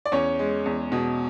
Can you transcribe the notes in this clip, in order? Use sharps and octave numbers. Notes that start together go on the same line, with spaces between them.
D5
E2 C#4 C#5
G#3
E2
B2